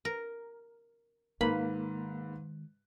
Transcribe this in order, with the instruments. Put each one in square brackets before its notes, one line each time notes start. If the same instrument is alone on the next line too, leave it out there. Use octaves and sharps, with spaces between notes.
[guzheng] A#4
[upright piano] G#2 B4 F5 [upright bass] D#3 G#3 [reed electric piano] A#3 [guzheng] B5